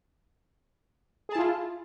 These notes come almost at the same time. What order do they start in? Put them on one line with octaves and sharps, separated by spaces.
G#4 A5 E4 F4